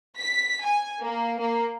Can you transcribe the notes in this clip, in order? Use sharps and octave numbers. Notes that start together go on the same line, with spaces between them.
B6
G#5
A#3
A#3